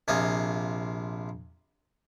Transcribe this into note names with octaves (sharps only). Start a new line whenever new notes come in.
A#1 C3 F4 D#5 G#5